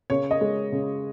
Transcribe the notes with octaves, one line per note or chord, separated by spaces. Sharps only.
C#3 C#5
D#5
G#3
C#3